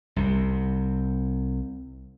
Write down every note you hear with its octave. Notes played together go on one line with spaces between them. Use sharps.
C2 C3